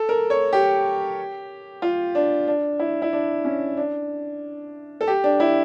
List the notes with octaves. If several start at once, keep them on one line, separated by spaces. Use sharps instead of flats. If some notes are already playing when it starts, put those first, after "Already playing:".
Already playing: A4
A#4
C#5
G4
F4
D4
D4
E4
E4
D4
C#4
D4
A4
G4
D4
E4